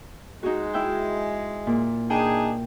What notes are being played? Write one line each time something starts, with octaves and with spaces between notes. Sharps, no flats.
G#3 D#4 F#4
E4 E5 G5
A#2
D4 D#4 G#4 G5